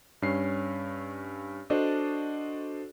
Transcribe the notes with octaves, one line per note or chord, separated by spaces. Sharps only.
G2 C#4 C7
D4 F#4 A4 C5 D5 D#5